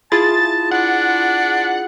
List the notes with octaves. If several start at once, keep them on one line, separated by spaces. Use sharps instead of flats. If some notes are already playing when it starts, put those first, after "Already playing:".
E4 F4 G#4 A5 A6
D4 F#5